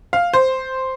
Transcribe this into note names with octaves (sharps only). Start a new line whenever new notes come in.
F5
C5